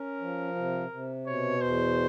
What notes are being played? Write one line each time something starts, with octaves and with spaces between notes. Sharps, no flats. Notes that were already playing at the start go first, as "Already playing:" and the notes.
Already playing: C#4 A#4
F3
C3
C3
B2 C#5
E2 C5